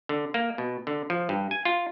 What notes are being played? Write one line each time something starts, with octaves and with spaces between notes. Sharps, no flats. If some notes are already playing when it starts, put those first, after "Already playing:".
D3
A#3
B2
D3
F3
G2
G#5
F4